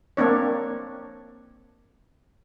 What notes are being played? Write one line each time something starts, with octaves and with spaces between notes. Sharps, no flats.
A#3 C4 D4 C#5